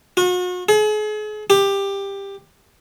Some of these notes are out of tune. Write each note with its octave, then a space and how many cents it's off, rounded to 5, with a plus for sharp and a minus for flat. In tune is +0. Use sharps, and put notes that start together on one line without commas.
F#4 -40
G#4 +40
G4 +15